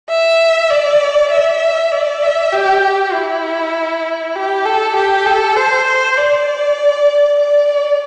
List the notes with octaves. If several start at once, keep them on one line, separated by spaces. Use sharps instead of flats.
E5
D5
E5
D5
E5
G4
G4
E4
G4
A4
G4
A4
C5
C5
D5
D5